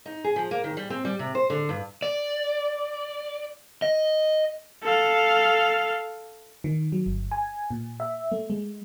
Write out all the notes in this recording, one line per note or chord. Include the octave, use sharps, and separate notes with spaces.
D#4
G#4
F3
A#3
D#3
G3
C4
G3
C3
C5
D3
G2
D5
D#5
A4 F5
D#3
F#3
G1
G#5
A#2
E5
A3
G#3